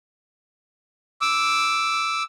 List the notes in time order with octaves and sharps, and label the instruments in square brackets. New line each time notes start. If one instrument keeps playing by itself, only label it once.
[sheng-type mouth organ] D6 E6